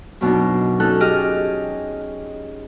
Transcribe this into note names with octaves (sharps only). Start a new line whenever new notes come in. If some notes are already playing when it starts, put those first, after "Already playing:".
F#2 B2 D4 D#4
C#4 D#4 A4 F#6
G4 G#4 D#5 F6